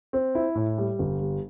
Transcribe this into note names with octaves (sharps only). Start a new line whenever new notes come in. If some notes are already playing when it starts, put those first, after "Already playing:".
C4
E4
A2
G3
G1
G3